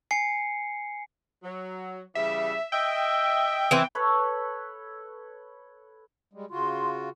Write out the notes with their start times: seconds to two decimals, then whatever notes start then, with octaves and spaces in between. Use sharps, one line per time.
0.11 G#5 C7 C#7
1.44 F#3
2.15 C#3 E3 G3 E5
2.72 D#5 E5 G5
3.71 E3 C4
3.95 A4 B4 C#5
6.33 G3 G#3
6.51 C#3 F4 F#4 C6